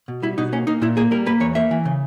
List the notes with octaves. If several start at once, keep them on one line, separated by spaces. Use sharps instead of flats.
B2
G3 E4
B2 D#4
A#3 C#4
A#3 D#4
A#2 E4
A#3 G#4
G3 A#4
A#3 B4
E2 C#5
A#3 E5
E3
C#3